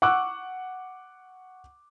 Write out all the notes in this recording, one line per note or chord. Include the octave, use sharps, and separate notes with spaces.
F#5 C#6 D6 E6 F#6